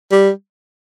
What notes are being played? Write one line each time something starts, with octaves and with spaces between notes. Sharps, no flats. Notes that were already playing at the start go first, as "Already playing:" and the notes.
G3